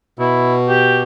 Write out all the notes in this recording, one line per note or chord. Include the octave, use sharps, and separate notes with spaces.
B2 E4
G4